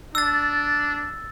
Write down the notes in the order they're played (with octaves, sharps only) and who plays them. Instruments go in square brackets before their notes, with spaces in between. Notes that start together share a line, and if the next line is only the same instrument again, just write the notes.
[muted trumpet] D4 [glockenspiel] E6 A6